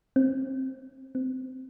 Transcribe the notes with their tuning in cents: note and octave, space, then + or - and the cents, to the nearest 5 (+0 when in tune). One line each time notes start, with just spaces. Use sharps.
C4 +25
C4 -20